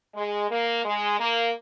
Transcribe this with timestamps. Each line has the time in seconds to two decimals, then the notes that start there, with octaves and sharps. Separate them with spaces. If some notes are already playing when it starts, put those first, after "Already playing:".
0.15 G#3
0.50 A#3
0.85 G#3
1.20 A#3